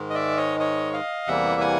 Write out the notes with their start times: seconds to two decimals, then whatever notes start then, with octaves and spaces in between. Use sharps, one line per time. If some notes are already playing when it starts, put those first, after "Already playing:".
Already playing: G#2 D#3 G#3
0.10 D#5
0.15 D5 E5
0.37 C#5 D#5
0.60 C#5 D#5
0.93 D#5 F5
1.27 E2 C3 E3 G3 A#3 E5 F#5
1.61 F#5 G#5